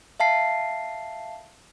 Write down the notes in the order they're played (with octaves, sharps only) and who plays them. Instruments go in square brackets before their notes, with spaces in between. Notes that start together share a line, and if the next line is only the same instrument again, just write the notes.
[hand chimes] E5 F5 A5 C7